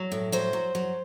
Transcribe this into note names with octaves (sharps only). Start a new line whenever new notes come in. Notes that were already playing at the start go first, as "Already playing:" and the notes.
Already playing: F#3
A2
F#3 C5
F#3
F#3